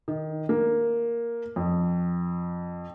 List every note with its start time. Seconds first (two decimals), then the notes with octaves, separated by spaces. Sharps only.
0.08 D#3
0.49 A#3
1.56 F2